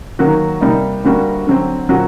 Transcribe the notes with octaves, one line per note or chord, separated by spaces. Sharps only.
D#3 F#3 A#3 F#4
C3 G3 A#3 D#4
D2 D3 G3 A#3 F#4
D3 F#3 C4
A#2 F#3 C4 F#4